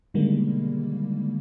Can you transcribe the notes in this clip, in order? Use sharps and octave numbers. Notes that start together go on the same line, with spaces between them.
B2 D3 D#3 G3 G#3 A#3